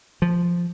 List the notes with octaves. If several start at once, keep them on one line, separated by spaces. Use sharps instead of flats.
F3